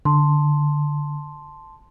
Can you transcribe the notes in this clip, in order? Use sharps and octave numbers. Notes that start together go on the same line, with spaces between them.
D3 A5 C6